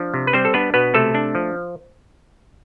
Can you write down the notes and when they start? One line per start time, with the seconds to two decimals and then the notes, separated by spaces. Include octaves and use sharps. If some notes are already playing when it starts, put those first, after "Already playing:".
Already playing: F3 D4
0.14 C3
0.27 B4
0.33 G3 C4 C5
0.45 A4
0.54 B3 D4 B4
0.74 B2 B3 B4
0.94 C3 A3 A4
1.15 D4
1.35 F3